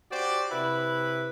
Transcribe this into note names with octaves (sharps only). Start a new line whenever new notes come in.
F#4 G4 C5 D5
C3 E4 B4 B5